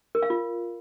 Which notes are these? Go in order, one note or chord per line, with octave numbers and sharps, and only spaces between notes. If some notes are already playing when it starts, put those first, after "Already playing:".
A#4
F5
F4